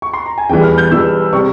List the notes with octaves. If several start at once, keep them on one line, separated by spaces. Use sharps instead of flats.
C#6
C6
A#5
G#5
E1 E2 E3 G3 G5
F6
G6
E1 E2 E3 G3 E6
C3 G3 C#6